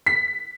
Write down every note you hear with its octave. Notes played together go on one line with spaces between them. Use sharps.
B6